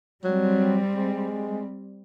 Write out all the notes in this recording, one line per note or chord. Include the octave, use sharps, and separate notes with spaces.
F#3 G3 C4
G#3